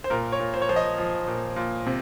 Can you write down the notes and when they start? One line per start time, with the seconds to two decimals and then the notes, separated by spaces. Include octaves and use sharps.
0.04 C5
0.10 A#2 A#4
0.32 C#5
0.39 A#2
0.54 C5
0.62 C#5
0.69 F3 C5
0.76 D#5
0.98 F3
1.27 A#2
1.56 A#2
1.86 C3